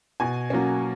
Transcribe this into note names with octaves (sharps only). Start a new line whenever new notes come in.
B2 G#5
F#3 A#3 C#4